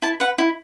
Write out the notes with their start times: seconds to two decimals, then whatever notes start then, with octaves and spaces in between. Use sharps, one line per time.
0.02 E4 A5
0.20 B4 F#5
0.38 E4